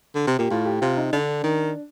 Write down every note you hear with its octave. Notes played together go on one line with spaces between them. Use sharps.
D3
C3
A#2 G4
A2 F4
G4
C3 F4
D#4
D3 D4
D#3